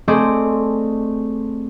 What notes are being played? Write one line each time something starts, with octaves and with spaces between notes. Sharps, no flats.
A3 C4 G#4 C5 D5 D#5